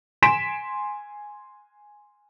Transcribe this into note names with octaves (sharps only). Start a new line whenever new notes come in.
G#5 C6 B6 D7 E7